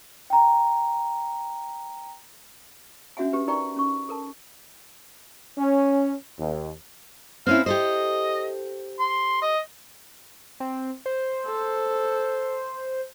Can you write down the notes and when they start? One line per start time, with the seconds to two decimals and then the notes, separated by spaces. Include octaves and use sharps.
0.30 G5 A#5
3.17 C#4 D4 F#4 E5 F#5 G#5
3.33 C#4 G4 B4
3.48 D#4 A#4 D5 G5 A#5 C#6
3.76 C#4 C#6
4.09 A4 A#4 A5
5.57 C#4
6.39 D#2
7.47 C4 C#4 E4 F5
7.66 G4 A4 C5 D#5
8.99 C6
9.42 D#5
10.60 C4
11.06 C5
11.46 A4